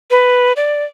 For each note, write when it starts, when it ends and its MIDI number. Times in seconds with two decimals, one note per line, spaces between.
0.11 0.53 71
0.56 0.84 74